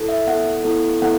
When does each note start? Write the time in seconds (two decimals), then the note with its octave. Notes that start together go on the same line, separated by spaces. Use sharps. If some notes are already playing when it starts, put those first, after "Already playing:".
Already playing: E4 A4
0.09 E5
0.27 B3 E4 A4 F#5
0.64 B3 E4 A4
1.02 B3 E4 A4 F#5